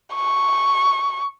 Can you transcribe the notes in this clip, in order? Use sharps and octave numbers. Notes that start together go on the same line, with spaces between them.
C#6